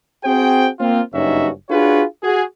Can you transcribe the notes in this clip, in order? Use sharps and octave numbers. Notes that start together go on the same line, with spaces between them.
C4 F#4 G#4 C5 G5
A#3 C4 F4
F#1 G2 C#4 D#4 F#4 E5
D4 F4 F#4 G#4 B4 C#5
F#4 G#4